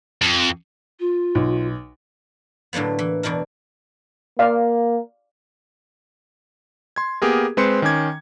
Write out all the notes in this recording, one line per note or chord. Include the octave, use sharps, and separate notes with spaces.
F2
F4
B1
A2 D3 F#3 A#3 B3
E3
E2 B2 D4 E4 A#4
A#3 D5 F5
C6 G#6
A#3 B3 G4 G#4 A#4
G#3 C4 B4 C5 C6 C#7
D#3 C#4 G#5 D6 G#6